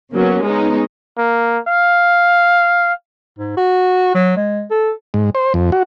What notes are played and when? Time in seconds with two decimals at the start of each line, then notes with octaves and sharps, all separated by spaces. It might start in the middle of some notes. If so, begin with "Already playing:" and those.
0.12 C#3 F#3 A#3 B3 C#4
0.45 G#3 B3 C#4 D#4
1.18 A#3
1.68 F5
3.39 G#2
3.57 F#4
4.14 F#3
4.36 G#3
4.70 A4
5.14 G#2
5.35 C5
5.54 F2
5.72 F#4